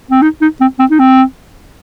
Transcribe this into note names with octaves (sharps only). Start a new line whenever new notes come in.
C4
D#4
D#4
C4
C4
D#4
C4